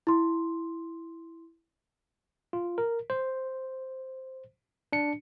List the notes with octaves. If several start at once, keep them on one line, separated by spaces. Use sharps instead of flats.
E4 C6
F4
A#4
C5
D4 C#7